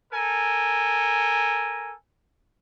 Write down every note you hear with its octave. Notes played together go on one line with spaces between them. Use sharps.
A4 A#4 G#5